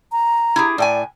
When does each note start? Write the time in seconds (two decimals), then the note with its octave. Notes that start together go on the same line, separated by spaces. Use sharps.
0.12 A#5
0.56 E4 G4 G#4
0.78 A2 D5 G5 G#5